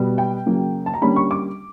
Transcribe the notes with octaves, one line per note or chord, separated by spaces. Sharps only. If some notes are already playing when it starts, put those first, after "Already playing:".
Already playing: B2 G3 B3
G5
C#3 F#3 A#3
A5
A#5
D3 G3 A#3 C#4 B5
C#6
D6